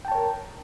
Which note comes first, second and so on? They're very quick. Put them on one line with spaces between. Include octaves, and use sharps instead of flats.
G5 A5 C#5 A#4